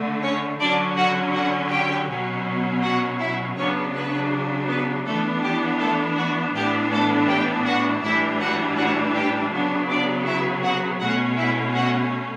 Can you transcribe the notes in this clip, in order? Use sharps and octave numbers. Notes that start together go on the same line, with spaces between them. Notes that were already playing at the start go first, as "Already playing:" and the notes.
Already playing: D3 A3
C#4 C#5
D3 F#3 C#4 D4 D5
F#4 F#5
F#4 F#5
G4 G5
B2 F#3 C#4
F#4 F#5
E4 E5
C#3 F#3 B3 C#4 D4 C#5
B3 B4
B3 B4
E3 A3 B3 D4 A4
G4
A3 A4
F#4
A2 E3 B3 D4 G4
A3 A4
G4 G5
F#4 F#5
A2 E3 G3 D4 E4 E5
F#4 F#5
F#4 F#5
G4 G5
C#3 F#3 B3 D4
D4 D5
E4 E5
F#4 F#5
B2 A3 C#4 F#4 F#5
E4 E5
F#4 F#5